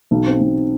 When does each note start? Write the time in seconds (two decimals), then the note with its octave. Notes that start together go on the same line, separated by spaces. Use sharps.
0.11 B1
0.26 C4
0.41 B1